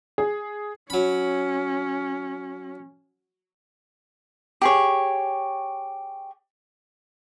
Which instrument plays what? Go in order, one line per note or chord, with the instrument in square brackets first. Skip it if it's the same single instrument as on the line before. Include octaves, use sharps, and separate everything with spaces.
[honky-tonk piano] G#4
[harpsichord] F#3 B5 [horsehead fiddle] C#4
[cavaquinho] G4 G#4 C#5